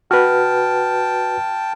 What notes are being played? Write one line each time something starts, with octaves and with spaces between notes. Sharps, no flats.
F#4 B4 G5 A5 F6